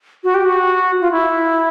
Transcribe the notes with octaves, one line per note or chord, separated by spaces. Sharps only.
F#4
G4
F#4
F4
E4